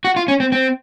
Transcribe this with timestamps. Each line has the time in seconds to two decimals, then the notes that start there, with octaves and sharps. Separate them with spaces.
0.05 F#4
0.16 F4
0.28 C#4
0.40 C4
0.52 C4